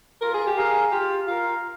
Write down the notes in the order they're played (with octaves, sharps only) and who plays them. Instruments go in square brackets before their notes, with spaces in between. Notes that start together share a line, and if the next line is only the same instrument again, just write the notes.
[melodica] F4 [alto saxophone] A#4
[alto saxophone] G#4
G4
[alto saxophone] G#4 [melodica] A#4 F5
[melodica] F4 [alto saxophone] G4
[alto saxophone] F4 [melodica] A#4 F5